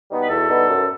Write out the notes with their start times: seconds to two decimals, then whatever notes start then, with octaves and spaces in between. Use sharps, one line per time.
0.09 B2 G3 B3 D#4
0.23 B4
0.29 E2 F#4 A4
0.48 B2 G3 B3 D#4
0.68 F#2